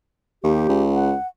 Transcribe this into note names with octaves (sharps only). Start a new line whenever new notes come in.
D#2 G4
C#2
F#5